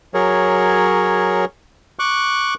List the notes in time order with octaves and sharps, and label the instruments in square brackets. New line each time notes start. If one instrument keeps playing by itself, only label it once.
[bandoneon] F#3 G#4 A#4 C#5
C#6 D6 F#6